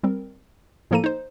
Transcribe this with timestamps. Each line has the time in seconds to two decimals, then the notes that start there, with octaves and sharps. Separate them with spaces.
0.04 G3 C4 A#4
0.91 A2 F3 A#3 A4 A#5 D#7
1.04 D#4 C5